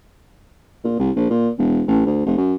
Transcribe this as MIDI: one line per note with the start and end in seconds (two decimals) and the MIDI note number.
0.84 0.95 46
0.99 1.11 36
1.16 1.30 34
1.30 1.49 46
1.59 1.82 28
1.87 2.01 33
2.06 2.23 38
2.26 2.37 29
2.37 2.55 42